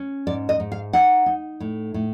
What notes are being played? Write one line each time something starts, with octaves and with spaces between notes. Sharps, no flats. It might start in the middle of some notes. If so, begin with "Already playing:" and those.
Already playing: C#4
G#2 D5
D#5
G#2
F5
D#4 F#5
D#4
A2
A2